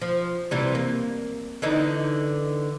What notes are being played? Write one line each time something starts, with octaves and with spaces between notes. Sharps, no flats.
F3
C3 E3 G3
A#3
D3 E3 D#4